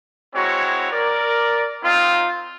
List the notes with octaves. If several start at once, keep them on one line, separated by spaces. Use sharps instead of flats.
G#3 C4 E4 F#4 C#5 A#5
A#4 D5
C4 D#4 F4